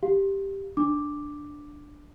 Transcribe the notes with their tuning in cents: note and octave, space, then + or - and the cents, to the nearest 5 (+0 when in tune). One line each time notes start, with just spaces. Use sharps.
G4 +0 F5 +0
D4 +0 D6 +0